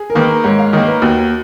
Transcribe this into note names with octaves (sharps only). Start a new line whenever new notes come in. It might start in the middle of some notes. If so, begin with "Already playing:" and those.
Already playing: G#4
A#4
D#3 A#3 B4
G#2 C#5
F5
D#3 A#3 D#5
B4
D#2 F#4